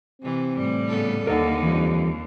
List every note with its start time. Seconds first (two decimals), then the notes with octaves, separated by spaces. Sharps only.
0.21 C3 E3 C4
0.54 A2 G3
0.88 C#3 B3 A4
1.27 D#2 D3 D#4 A4 A#4 F#5
1.62 F2 E3 G3